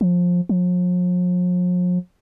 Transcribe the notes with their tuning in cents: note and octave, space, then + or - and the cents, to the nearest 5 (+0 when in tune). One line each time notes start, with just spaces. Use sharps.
F3 +20
F3 +45